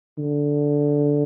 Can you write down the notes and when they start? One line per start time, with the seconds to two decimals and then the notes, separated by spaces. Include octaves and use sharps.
0.18 D3